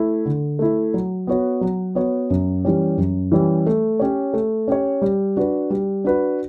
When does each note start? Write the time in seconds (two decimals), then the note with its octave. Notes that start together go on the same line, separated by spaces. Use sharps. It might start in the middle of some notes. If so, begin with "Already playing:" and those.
Already playing: A3 E4
0.26 D3
0.59 A3 E4
0.94 F#3
1.27 B3 F#4 C#5
1.61 F#3
1.95 B3 F#4 C#5
2.30 F#2
2.65 E3 G3 C#4 G4
2.98 F#2
3.32 E3 G3 C#4 G4
3.67 A3
4.00 C#4 G4 C#5
4.34 A3
4.68 C#4 G4 C#5
5.02 G3
5.37 D4 F#4 B4
5.70 G3
6.04 D4 F#4 B4